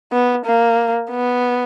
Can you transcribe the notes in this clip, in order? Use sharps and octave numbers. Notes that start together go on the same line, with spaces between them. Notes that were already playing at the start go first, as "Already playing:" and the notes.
B3
A#3
B3